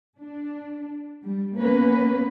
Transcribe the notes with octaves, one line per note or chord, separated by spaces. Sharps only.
D4
G3
A#3 B3 C#4 B4